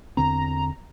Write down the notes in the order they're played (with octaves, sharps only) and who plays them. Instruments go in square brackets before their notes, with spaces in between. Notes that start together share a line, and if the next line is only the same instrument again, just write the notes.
[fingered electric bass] E2 D3 C4 [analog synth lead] A#5